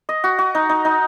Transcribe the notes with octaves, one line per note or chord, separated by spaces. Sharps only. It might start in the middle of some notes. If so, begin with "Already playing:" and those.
D#5
F#4
F#4
D#4
D#4
D#4